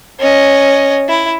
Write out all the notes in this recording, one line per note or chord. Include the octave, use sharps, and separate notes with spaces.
C#4 D#5
E4